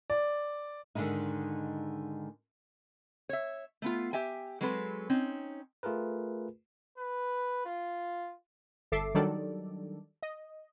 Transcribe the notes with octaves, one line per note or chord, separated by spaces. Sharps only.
D5
G#2 D3 D#3 G#3 D#4
C#5 E5
A3 B3 F4
G4 E5 G5 G#5
F#3 G#3 C4 A4 B4
C4 C#4 D#4
A3 F4 G#4 A#4 B4
B4
F4
G1 A4 E5 D6 C7
D#3 F#3 G3 D4 A4 D5
D#5